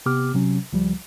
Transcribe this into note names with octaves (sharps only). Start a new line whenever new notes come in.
C3 B3 G4 D6 F6
C3 F#3 C#4
C#2 F3 G3